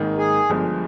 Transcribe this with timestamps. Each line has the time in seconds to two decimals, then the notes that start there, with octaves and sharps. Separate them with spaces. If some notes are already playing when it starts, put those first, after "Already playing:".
Already playing: G#1 G#2 D#3 A#3 D#4
0.18 G#4
0.49 G1 G2 F3 G#3